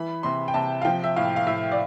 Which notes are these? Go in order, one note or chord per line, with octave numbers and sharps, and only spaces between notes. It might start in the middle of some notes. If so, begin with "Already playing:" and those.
Already playing: E3 B5
C3 C6
G5
C3 A5
F5
F3 G5
E5
A2 F5
F5
A2 E5
D5